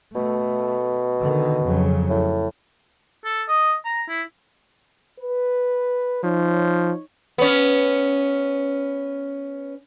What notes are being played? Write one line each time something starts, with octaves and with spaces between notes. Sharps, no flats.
B2 A3
D3 D#3
F2 C#3 F#3
A2
A4
D#5
A#5
E4
B4
F3 D#4 C#5
B3 C#4